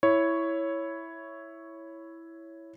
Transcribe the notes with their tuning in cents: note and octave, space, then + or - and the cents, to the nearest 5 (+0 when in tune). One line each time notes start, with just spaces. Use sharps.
E4 +0 C#5 +0